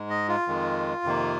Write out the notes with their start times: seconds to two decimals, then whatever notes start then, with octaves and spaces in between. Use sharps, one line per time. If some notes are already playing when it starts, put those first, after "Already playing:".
Already playing: G#2 G#3
0.10 D#5
0.28 F4
0.48 F2 D#3 G#3
1.04 F2 C3 D#3 A#3